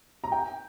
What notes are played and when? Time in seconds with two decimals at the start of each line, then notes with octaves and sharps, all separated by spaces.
0.24 A#5
0.32 G5